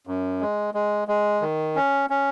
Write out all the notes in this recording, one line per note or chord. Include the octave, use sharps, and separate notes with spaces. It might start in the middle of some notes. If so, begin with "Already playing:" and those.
F#2
G#3
G#3
G#3
D#3
C#4
C#4